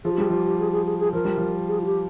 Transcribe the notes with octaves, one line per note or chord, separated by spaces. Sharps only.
F3 G#4
G4
G3 G#4
F3 G4
G4
G#4
G#4
G#4
G#4
F3 A#4
G3
F3
G#4
F4
G4